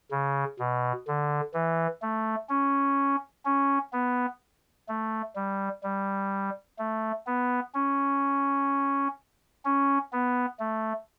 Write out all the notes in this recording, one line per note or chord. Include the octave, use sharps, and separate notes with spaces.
C#3
B2
D3
E3
A3
C#4
C#4
B3
A3
G3
G3
A3
B3
C#4
C#4
B3
A3